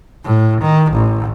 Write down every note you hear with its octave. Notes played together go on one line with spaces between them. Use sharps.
A2
D#3
A1